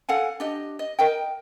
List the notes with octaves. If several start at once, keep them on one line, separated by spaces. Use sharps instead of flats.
A4 F5 F#5 G#5
D4 G4 D#5
D#5
A#4 D#5 G5